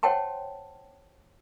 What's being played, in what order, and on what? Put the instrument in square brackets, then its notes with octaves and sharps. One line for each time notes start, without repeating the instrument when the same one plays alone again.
[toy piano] C5 C#5 F#5 G5 A5 C6